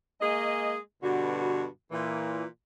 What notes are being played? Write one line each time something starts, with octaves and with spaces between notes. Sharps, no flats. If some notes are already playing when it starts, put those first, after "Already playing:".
G#3 A#3 G#4 D#5
G2 B2 D3 F#4
A#2 E3